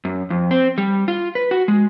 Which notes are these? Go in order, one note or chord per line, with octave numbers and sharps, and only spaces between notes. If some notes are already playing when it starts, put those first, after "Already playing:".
F#2
F2
C4
G3
F4
B4
F#4
G#3